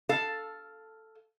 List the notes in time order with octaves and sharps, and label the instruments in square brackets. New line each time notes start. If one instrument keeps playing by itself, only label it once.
[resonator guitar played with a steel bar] A4 F5